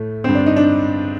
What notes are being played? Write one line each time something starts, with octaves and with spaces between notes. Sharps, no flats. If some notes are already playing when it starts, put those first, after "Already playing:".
Already playing: A2 A3
G2 D3 C4
D4
D#4
D4